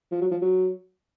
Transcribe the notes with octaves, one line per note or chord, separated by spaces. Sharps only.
F3
F#3
F3
F#3